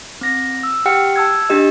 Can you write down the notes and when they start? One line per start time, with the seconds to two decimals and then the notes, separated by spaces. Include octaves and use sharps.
0.21 C4 A#6
0.63 E6
0.85 G4 F#5 G5 F6 C#7
1.16 A5 E6 G#6
1.50 D4 G4 D#5